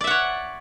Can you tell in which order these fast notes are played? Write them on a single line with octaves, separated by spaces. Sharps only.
D5 E5 F#5 C#5